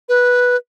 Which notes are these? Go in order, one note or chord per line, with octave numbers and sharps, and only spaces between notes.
B4